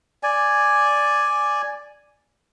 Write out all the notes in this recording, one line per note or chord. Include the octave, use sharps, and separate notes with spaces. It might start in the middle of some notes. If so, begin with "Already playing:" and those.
D5 G#5